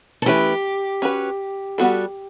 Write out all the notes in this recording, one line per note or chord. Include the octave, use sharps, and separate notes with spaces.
A4
E3 A3 C#4 E4 G4 B4
C#4 F#4 B4
G3 B3 F#4 A4